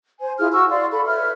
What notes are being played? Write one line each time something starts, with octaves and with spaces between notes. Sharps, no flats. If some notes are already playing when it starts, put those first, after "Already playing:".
C5 G#5
E4 F4 G#4 F6
F#4 C#6 E6
D5 F5 C6
A4 B5
B4 C#5 E5 F6